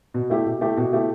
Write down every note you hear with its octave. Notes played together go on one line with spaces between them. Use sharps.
B2
A3 E4 G4
B2
A3 E4 G4
B2
A3 E4 G4